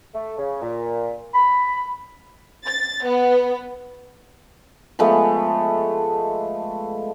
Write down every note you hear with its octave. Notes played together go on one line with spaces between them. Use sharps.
A3
C#3
A#2
B5
A6
B3
F3 G#3 A3 B3